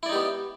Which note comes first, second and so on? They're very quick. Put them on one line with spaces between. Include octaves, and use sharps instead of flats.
E4 D5 D#4 G4 B3